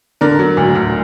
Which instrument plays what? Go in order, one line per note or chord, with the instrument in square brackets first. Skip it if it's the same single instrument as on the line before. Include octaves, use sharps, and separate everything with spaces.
[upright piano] D3 A#4 D5
F#3
D2
D2